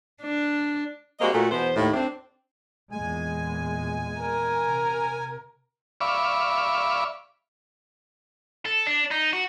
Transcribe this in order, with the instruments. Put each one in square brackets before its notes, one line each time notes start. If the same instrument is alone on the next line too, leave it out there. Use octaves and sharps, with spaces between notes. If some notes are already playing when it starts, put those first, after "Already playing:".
[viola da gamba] D4
[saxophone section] G3 G#3 A#3 C4 F#4 D#5
A#2 A3 F#4
E2 B2 B3 C5
D#2 A2
C4 D4
[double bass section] E2 A#2 G#3 [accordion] G#5
[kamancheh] A#4
[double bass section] C3
[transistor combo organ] D5 E5 F5 B5 C#6 D6
[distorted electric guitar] A4
D4
D#4
F#4